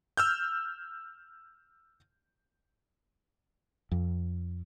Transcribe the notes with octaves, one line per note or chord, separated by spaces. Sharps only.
E6 F6 G6
F2